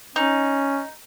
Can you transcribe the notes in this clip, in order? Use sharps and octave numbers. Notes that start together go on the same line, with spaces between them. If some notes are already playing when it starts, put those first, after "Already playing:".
C#4 D#4